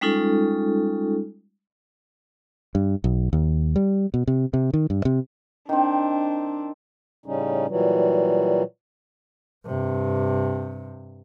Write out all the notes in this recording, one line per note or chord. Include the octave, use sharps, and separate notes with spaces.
G3 G#3 C#4 D#4 F4 A4
G2
B1
D#2
G3
B2
C3
C3
D#3
G2
C3
D#3 C4 D4
A2 C#3 G3 C#4 D#4
A#2 E3 F#3 G3
G2 C3